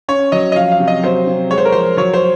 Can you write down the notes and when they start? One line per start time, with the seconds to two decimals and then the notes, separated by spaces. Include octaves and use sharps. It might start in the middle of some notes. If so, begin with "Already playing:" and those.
0.08 C#4 C#5
0.32 F#3 D#5
0.52 D#5
0.56 F3 F5
0.72 F5
0.80 C3
0.88 D#5
1.03 F#3 C5
1.27 C3
1.50 G#3 C#5
1.58 C5
1.65 A#4
1.72 F3 C5
1.97 F#3 C#5
2.14 C5